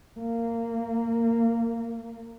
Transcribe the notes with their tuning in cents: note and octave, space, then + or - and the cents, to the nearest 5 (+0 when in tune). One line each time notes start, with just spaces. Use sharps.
A#3 -20